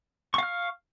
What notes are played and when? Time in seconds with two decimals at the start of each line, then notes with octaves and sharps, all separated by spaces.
0.34 C#6
0.38 F5
0.43 F6